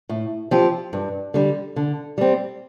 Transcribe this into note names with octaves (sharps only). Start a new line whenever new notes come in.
A2
F3 C4 G4
G2
D3 G3
D3
G3 C4